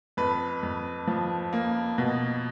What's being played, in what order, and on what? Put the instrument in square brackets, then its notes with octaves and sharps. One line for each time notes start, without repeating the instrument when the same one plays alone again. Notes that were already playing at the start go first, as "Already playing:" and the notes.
[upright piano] F2 B4
F2
F3
A#3
B2